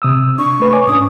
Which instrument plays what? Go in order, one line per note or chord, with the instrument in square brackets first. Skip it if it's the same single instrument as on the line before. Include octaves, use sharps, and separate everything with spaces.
[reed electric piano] C3 D#6 E6
[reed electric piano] D4 [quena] C#6
[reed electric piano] A3 B4
C#5 G#5 D6
[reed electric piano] G#2 C#4 D4 [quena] D#6